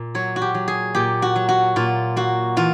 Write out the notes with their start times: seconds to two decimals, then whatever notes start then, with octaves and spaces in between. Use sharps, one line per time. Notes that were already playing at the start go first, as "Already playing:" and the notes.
Already playing: A#2
0.15 F#3 C#5
0.36 F#4
0.42 G4
0.54 F#3
0.68 G#4
0.95 A#2 G4
1.22 F#4
1.36 F#3
1.49 F#4
1.76 A#2 F4
2.16 A#3 F#4
2.57 E3 F4